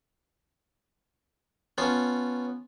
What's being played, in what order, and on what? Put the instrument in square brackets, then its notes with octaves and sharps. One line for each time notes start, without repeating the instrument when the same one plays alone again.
[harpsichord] B3 C#4 F4 A4